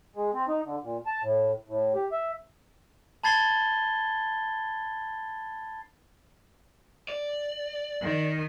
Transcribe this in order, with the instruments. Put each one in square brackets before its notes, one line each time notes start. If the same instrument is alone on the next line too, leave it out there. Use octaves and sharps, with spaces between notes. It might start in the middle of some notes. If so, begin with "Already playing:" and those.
[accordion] G#3
C4
D#4
D3
A#2
A5
A2
A2
G4
E5
[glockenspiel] A5 B5 G#6 A6 C7 G7
[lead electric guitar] D5
[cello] D#3